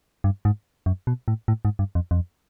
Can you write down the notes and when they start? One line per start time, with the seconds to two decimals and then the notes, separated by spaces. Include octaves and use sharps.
0.24 G2
0.45 G#2
0.86 F#2
1.07 B2
1.28 A2
1.48 A2
1.65 G#2
1.79 G2
1.95 F2
2.11 F2